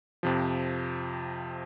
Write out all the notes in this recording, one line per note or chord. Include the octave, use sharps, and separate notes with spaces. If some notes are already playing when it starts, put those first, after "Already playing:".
F2 C3 F3